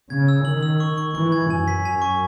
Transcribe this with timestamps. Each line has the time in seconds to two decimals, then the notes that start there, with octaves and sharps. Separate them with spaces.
0.10 C#3 G#6
0.28 E6
0.45 D#3 F#7
0.63 E6
0.80 C#6
0.98 C#6
1.15 E3 C#6
1.32 G#6
1.50 F#2 G#5
1.68 B6
1.85 F#2 G#5
2.02 C#6